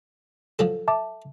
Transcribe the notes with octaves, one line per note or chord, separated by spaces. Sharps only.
F3 F#3 A4
E5 A5 D6